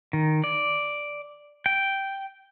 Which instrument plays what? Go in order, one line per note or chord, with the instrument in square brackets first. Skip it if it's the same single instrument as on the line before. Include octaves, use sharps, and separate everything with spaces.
[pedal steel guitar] D#3
D5
G5